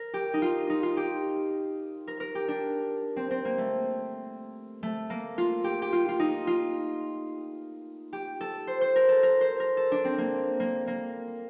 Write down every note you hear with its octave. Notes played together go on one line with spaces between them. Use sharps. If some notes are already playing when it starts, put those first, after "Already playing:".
Already playing: A#4
G4
D#4
F4
D#4
F4
G4
A#4
A#4
G4
D4
C4
C4
A#3
A3
A3
A#3
F4
G4
G4
F4
F4
D#4
F4
G4
A4
C5
C5
A#4
A4
A#4
C5
A#4
A4
D4
C4
A#3
A#3
A#3